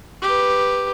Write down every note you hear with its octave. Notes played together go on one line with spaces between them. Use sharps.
G4 B4